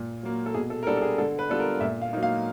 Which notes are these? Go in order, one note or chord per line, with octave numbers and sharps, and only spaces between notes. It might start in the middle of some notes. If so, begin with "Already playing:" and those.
Already playing: A#2
F#3 A#3
A4
B2 G#4
A4
A#4
G3 B3 D4 A4
A4
G#4
D3 A4
B4
G3 B3 D4 F4 A4
A#4
A#2 E5
F5
F#3 A#3 D#4
F5